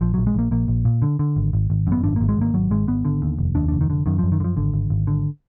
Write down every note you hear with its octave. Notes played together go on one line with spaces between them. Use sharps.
A#1 F3
A#1 F#3
G#3
A#1 A#3
A#1 A#3
A#1
A#2
D3
D3
G#1
G#1
G#1
F#2
B3
G#1 D4
G#1 A#3
G#3
G#1 A#3
G#1 F#3
G#1 G#3
G#1 B3
D3
D#2
F1
D#2 D4
F1 D4
D#3
D3
F#2 D#3
F#2 F3
D#3
D3
F3
G#1 D3
G#1
G#1
D3